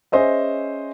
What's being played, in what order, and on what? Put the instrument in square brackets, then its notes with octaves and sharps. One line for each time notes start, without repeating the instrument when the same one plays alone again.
[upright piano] C#4 G#4 C5 D#5 E5